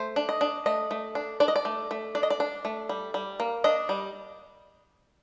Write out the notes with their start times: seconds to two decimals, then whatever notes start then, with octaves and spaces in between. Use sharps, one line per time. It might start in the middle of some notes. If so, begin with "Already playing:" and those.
Already playing: A3 C5
0.16 D4
0.29 D#5
0.41 D4
0.66 A3 D#5
0.91 A3
1.15 D4
1.40 D4 D5
1.48 D#5
1.56 D5
1.65 A3
1.91 A3
2.15 D4 D5
2.23 D#5
2.30 D5
2.40 D4
2.65 A3
2.89 G3
3.14 G3
3.40 A#3
3.64 D4 D#5
3.89 G3